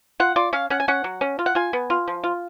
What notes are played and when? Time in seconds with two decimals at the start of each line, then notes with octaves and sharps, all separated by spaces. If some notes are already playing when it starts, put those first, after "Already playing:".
0.20 F4 F#5
0.36 F4 D5
0.53 C#4 F5
0.70 C#4 F#5
0.80 G#5
0.88 C#4 F#5
1.04 F#3
1.21 C#4
1.39 F4
1.46 F#5
1.55 F4 G#5
1.73 B3
1.90 F4
2.08 F3
2.24 F4